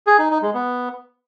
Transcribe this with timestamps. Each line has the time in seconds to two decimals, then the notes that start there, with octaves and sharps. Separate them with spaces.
0.07 G#4
0.19 D#4
0.30 D#4
0.42 G#3
0.54 B3